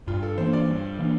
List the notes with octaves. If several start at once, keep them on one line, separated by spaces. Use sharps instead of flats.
G2 F4
A4
E3 A#3 D4 C5
D5
G2
E3 A#3 D4